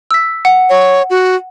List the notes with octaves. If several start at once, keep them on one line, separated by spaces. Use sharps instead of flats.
E6 B6
F#5
C#5
F#4